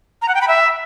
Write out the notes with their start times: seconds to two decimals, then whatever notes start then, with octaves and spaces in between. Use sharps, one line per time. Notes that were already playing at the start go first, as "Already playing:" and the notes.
0.22 A#5
0.28 F#5
0.35 G5
0.41 B5
0.48 E5